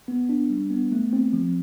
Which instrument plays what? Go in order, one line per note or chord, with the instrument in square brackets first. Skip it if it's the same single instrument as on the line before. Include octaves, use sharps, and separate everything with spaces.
[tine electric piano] B3
D4
G3
B3
A3
C4
F3